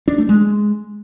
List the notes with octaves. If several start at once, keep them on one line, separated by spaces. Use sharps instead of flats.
D4
A3
G#3